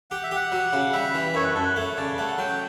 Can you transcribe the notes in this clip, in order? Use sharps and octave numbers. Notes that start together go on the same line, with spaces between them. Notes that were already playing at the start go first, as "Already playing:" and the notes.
G4 F#5
E5
G4 F#5
F#3
C#3
G3 E5
E3
F#2 C#5
B4
F#2 A4
B4
A3 C#5
C#3 D5
A3 F#5
F#3 G5